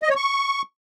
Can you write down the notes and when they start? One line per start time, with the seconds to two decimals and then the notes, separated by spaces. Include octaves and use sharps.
0.03 D#5
0.09 C#5
0.16 C#6